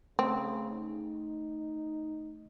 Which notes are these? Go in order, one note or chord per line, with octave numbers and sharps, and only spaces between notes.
C#3 A3 C4
D#4